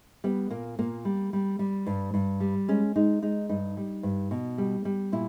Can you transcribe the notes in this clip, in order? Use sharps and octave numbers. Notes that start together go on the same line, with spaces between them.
G3 B3
A#2 A#3
A#2 A#3
G3
G3
G3
G2
G2
G3
G#3 C#4
G#3 D#4
G#3 D#4
G2 D#4
G3
G2
B2
G3
G3
A#2 E4